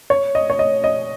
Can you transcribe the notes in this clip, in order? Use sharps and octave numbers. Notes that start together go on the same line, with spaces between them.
C#5
D#5
C#5
D#5
D#5